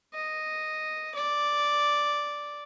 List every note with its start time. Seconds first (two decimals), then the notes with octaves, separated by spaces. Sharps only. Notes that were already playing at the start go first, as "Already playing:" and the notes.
0.14 D#5
1.15 D5